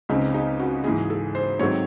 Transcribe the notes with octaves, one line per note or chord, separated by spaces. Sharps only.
C#2 C#3 G#3 C4 D#4
D#4
F#4
G#2 E3 G#3 G#4
A4
C5
G#2 D#3 F#3 A3 C4 C#5